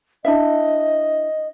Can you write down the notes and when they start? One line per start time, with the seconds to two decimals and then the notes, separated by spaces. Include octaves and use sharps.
0.25 D4 E4 D#5 E5